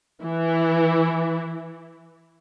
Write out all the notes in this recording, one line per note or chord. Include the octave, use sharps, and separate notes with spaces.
E3 E4